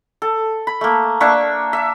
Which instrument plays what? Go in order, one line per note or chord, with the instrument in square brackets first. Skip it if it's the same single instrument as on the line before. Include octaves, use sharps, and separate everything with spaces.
[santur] A4
B5
A3 A#3
A#3 D4 E5 C#6
E5